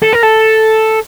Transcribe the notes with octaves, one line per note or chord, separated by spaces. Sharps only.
A4
A#4
A4